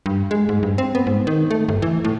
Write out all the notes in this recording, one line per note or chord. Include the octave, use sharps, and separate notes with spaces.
G2
G#3
G#2
G2
C4
B3
G#2
D#3
A3
G1
E3
A2